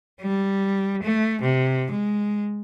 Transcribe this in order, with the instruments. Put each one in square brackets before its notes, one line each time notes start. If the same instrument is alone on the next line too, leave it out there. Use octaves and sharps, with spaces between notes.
[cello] G3
A3
C3
G#3